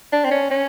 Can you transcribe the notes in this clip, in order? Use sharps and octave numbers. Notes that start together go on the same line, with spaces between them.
D4
C4
C#4
C#4